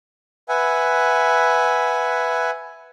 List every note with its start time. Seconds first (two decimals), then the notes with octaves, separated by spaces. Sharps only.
0.49 B4 E5 F#5 G#5